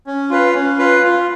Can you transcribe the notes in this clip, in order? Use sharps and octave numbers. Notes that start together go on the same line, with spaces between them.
C#4
F4 B4 F5
C#4
F4 B4 F5
F4